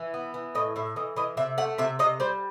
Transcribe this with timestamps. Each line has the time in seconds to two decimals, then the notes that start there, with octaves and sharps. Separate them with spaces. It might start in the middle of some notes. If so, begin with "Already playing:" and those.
Already playing: E3
0.14 B3
0.34 E3
0.55 A2 D#5
0.76 A2 E5
0.96 E3 D#5
1.16 E3 D#5
1.37 C3 E5
1.58 A3 F#5
1.78 C3 E5
1.99 C3 D#5
2.20 G3 C5